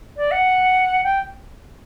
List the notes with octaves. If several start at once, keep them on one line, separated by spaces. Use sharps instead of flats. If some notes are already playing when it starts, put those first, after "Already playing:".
D5
F#5
G5